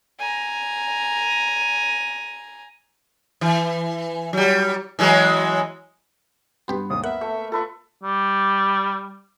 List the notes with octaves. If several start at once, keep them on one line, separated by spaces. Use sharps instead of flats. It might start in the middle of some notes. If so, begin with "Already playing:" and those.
G#5 A#5
E3
F#3 G3
E3 F#3 G#3
G2 B3 F#4 G4 B4 C6
G#1 D#2 D#6
A#3 B3 A#4 E5 F#5
A3
F4 A4 B4 E5
G3